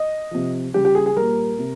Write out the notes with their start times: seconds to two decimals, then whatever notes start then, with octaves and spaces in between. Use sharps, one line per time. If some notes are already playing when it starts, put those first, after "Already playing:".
Already playing: D#5
0.31 C3 F3
0.73 C#3 G3 G4
0.85 G4
0.95 G#4
1.06 G#4
1.16 A#2 G3 A#4
1.59 C3